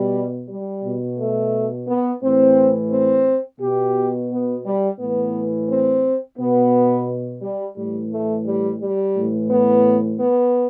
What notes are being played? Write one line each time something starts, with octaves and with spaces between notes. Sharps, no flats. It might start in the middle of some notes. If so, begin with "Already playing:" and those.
Already playing: B2 G3
G3
B2
A3
B3
A2 E3 C4
C4
B2 G4
B3
G3
A2 E3 B3
C4
B2 B3
G3
A2 E3 G3
A3
G3
G3
A2 E3
B3
B3